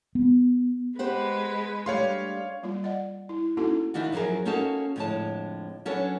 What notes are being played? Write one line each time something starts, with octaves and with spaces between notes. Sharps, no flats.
B3
G#3 G4 B4 C5 F#5
G3 A3 D4 C#5 F5 C6
G3 A#3 F4
D5 D#5 F#5
E4
A#3 C#4 D#4 E4 F#4 A4
D#3 E3 D4 F4 F#4
F#2 F3 F#3 G#4 A#4
A#3 C#4 D#4 F#4 A4 A5
F2 A2 D3 G#3 C#5 A5
F#3 C#4 D4 A4 B4 C#5